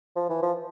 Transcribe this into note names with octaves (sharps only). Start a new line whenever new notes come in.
F3
E3
F3